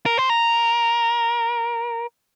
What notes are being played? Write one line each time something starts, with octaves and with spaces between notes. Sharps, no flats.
A#4
C5
A#4